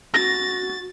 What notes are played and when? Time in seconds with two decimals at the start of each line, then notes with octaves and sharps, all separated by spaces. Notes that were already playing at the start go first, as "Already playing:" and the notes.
0.14 F#4 A6 A#6